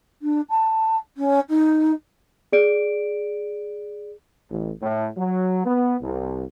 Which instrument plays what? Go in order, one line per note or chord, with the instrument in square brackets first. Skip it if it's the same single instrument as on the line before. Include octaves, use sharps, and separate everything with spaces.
[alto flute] D4
A5
C#4
D#4
[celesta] G#4 D5 D7
[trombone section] A1
A2
F#3
B3
C2